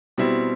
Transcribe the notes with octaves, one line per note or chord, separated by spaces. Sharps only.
B2 G3 C4 E4